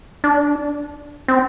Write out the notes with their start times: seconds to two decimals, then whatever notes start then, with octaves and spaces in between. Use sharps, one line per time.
0.24 D4
1.28 C4